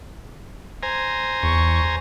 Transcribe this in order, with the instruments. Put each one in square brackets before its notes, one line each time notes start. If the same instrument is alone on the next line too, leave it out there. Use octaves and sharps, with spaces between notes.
[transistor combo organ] C5 G#5 A#5
[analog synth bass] E2 [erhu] C#6